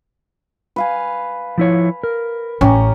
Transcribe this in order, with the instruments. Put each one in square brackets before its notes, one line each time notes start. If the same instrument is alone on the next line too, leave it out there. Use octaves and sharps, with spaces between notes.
[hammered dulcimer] B4 F5 G#5
[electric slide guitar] F3 E4 C#5
A#4
[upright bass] A1 [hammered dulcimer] C#4 G4 A#5